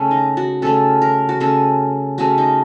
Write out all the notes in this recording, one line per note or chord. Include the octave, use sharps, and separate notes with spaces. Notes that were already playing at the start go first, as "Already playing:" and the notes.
Already playing: C#3 A3 C#4
D#4
F#4
C#3 A3 C#4 A4
A#4
F#4
C#3 A3 C#4 A4
C#3 A3 C#4 F#4
D#4